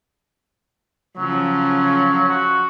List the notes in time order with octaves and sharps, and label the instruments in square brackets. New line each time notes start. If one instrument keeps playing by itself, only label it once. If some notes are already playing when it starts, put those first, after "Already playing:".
[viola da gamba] C#3 F3 [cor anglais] F#3
[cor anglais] F#4